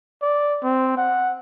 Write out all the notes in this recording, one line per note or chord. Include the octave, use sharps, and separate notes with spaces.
D5
C4
F#5